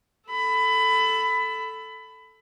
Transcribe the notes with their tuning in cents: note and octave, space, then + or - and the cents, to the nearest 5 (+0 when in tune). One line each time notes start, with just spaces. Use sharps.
A4 +0 B5 +20